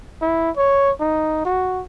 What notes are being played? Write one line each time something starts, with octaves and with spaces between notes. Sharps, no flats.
E4
C#5
D#4
F#4